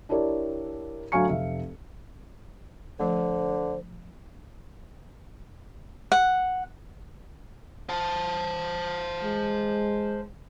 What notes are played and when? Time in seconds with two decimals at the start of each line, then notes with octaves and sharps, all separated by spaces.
0.09 D4 E4 G4 A#4 C#5 D5
1.12 D2 F#3 F5 G#5 C#6 C#7
1.29 F1 E5 F5
2.99 D3 F3 A3 C5
6.12 F#5
7.89 C5 A5
9.23 G#3